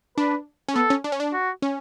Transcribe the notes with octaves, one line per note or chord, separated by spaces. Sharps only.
D4 B4
C#4
B3 A4
C#4
D4
C#4
D4
F#4
C#4